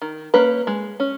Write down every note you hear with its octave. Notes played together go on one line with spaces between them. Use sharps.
D#3
A#3 C#4 B4
G#3
C#4